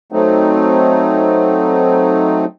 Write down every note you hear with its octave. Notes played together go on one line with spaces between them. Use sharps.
F#3 A3 C4 D#4